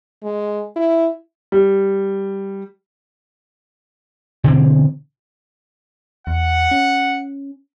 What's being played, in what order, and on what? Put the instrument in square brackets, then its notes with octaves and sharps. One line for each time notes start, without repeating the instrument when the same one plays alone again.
[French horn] G#3
E4
[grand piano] G3
[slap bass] B2 D3 E3 C4
[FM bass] E2 [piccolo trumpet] F#5
[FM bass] C#4